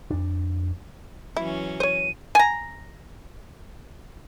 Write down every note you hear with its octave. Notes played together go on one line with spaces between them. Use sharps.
F2 D4
E3 F#3 C#4 E4
C5 C#5 D#7
G#5 A#5